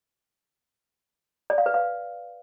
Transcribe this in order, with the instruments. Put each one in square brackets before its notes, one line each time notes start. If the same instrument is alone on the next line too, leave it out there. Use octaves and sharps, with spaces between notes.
[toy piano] D5
F5
B4
F5